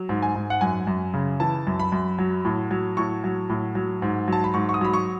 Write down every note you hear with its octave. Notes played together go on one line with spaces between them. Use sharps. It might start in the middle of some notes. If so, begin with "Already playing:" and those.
Already playing: F#3
G#2
G#5
G#2
F#5
F#2 G#5
F#2
C#3
E3 A5
F#2
B5
F#2
F#3
A2
F#3
A2 C#6
F#3
A2
F#3
G#2
F#3 A5
B5
G#2 C#6
C#6
D#6
F#3 B5
C#6